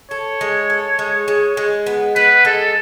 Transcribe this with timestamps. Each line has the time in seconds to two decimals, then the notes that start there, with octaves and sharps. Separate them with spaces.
0.11 A4 C#5
0.41 G#3
0.70 A4
0.99 G#3
1.28 G#3
1.57 G#3
1.87 B3
2.15 B3 B4
2.45 G#3 A4